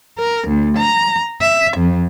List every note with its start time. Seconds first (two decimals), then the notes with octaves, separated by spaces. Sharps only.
0.18 A#4
0.48 D2
0.77 A#5
1.41 E5
1.77 F2